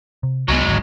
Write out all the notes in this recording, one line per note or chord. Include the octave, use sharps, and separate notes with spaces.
C3
C2 F#3 G#3 A3 B3
D1 G#1 D3